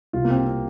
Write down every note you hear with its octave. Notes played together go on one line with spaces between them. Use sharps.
C2 F4
A#3
C4
C3
C4